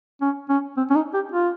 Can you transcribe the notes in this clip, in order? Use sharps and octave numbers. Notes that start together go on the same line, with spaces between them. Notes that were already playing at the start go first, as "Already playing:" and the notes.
C#4
C#4
C4
C#4
D#4
G4
F4